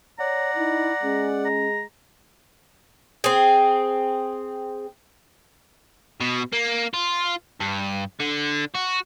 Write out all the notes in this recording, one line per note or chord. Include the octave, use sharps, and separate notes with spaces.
C#5 D5 F#5 A#5
D#4 E4
G#3 C#4
A#5
C4 G#4
B2
A#3
F4
G2
D3
F#4